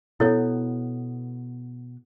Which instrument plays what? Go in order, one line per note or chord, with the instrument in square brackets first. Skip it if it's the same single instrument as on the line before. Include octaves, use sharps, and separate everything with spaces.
[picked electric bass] B2 B3 [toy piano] E4 A4 C#5